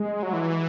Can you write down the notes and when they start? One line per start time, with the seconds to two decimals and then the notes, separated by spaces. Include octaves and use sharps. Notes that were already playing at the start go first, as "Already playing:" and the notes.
Already playing: G#3
0.23 F#3
0.33 E3